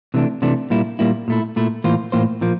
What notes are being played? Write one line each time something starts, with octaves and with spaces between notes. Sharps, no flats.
C3 E3 A3 D4
C3 E3 A3 D4
A#2 G3 A#3 E4
A#2 G3 A#3 E4
A#2 A3 E4
A#2 A3 E4
A2 E3 A#3 F4 C5
A2 E3 A#3 F4 C5
A#2 F3 A#3